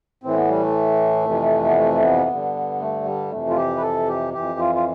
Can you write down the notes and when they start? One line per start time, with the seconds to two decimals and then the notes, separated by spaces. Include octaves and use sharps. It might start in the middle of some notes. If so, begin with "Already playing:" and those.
0.24 A2 E3 C4
0.36 B3
0.49 G3
0.62 A3
1.26 F2 C3 E3
1.68 B3
1.77 A3
2.03 B3
2.29 G2 D3
2.80 A3
3.05 G3
3.31 F2 C3 E3 A3
3.50 F4
3.56 G4
3.77 B4
3.82 A4
4.08 G4
4.33 F2 E3 G4
4.60 F4
4.75 F4